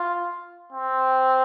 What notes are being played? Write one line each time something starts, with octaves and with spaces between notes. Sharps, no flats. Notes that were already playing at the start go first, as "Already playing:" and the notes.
Already playing: F4
C4